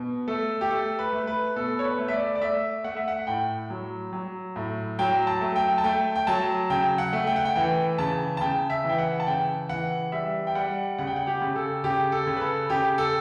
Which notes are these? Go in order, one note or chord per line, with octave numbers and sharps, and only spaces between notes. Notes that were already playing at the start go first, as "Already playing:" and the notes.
Already playing: B2
A3 A4
G4
A3 A4
B4
A3
B4
B2 A4
C#5
B4
A3
E5
D5
D5
A3 E5
A3 F#5
E5
F#5
A2 G5
F#3
F#3
A2
F#3 G5
A5
A3
G5
A5
A3 G5
G5
F#3 A5
C#3 G5
F#5
A3
G5
F#5
G5
E3 G5
C#3 A5
A5
C#3 G5
E5
E3 G5
F#5
A5
C#3 G5
E3 F#5
G3 E5
G5
G3 F#5
C#3 F#5
G5
F#5
G4
C#3
A4
C#3 G4
A4
C#3
B4
A4
C#3 G4
A4